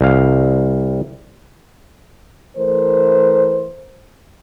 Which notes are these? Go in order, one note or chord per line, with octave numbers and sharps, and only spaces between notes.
C2 F5
E3 A3 A#4 C5